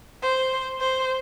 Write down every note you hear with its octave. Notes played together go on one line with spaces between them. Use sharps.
C5
C5